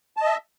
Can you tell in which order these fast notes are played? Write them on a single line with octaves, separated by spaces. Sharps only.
A5 D#5 E5